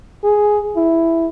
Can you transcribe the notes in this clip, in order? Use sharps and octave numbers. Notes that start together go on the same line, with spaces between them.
G#4
E4